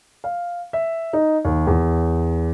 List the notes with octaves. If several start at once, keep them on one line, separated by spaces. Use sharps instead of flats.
F5
E5
D#4
D#2
E2